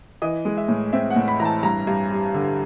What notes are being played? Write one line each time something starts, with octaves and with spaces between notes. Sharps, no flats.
E3 D#5
G#3
E5
A2
C4 E5
F#5
A2
B5
E3 A#5
A5
G2 A#5
G2
G3
D3